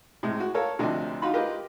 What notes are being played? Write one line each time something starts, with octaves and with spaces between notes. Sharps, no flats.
A2 C3 G#3
F#4
A4 A#4 C#5 F5
D2 C3 F3 D4 D#5 G5
D#4 F4 F#4 F5 B5 C6
F4 G4 A#4 B4 D#5